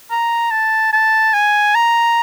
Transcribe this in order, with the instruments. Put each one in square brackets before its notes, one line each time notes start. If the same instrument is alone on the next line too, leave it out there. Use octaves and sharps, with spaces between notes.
[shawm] A#5
A5
A5
G#5
A#5